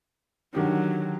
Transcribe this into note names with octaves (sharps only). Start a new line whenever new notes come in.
D3 D#3 F#3 G4